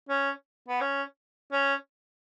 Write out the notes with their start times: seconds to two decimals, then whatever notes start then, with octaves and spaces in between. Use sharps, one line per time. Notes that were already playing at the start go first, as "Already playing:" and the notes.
0.09 C#4
0.68 B3
0.81 C#4
1.52 C#4